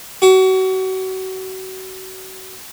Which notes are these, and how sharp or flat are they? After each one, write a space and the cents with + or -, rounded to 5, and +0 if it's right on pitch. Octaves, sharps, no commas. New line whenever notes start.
F#4 +30